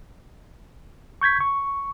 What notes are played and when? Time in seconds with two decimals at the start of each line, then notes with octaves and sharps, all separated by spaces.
1.21 C#6 G6 G#6 B6
1.41 C#6